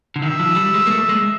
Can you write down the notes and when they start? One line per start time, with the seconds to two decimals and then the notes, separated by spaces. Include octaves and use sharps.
0.16 D3
0.22 D#3 E5
0.40 F3
0.56 G3
0.74 G#3
0.87 A#3
0.91 A3
1.09 G#3